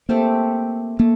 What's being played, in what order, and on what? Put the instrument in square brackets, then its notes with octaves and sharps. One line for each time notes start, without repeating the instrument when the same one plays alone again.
[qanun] A3 C4 G4 [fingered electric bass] A#3
[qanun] A3 [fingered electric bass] A#3